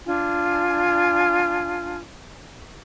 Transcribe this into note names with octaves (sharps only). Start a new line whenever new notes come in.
D4 F4 G#5